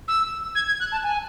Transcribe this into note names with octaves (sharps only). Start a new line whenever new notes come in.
E6
G#6
G#6
F#6
A5
G#5